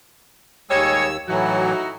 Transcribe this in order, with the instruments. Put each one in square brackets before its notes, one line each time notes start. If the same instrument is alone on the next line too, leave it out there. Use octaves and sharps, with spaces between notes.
[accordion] D#2 E6 [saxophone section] G3 G#3 C#5
[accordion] A2 E3 F#3 [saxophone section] D#4 E4 F#4